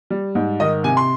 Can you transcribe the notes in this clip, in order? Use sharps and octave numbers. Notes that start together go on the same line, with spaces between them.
G3
G#2
D#3 D#5
C3 G#5
C6